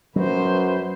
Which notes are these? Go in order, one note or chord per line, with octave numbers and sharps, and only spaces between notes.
F#2 F#3 B4 C5